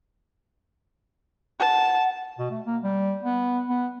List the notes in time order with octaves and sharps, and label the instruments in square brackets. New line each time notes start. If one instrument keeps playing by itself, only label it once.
[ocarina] F#5 [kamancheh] A5
[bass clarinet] B2
A3
A#3
G3
B3
B3